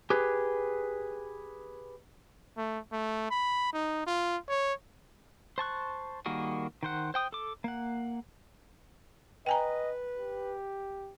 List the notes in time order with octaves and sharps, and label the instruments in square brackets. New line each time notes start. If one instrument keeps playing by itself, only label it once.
[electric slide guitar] G4 G#4 B4
[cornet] A3
A3
B5
D#4
F4
C#5
[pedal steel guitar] C5 A5 C#6 F#6
D#3 G3 A#3 F#4 G#4
D#3 C5 F#5
C5 G5 D#6
A4 D6
A#3 F#5
[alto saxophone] B4 [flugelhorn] D#5 [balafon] G5 G#5 A#5
[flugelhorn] G4